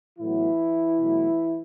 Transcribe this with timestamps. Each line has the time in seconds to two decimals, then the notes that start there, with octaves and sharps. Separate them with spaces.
0.19 A2 E3 F#3 B3 E4
0.99 B2 F#3 A3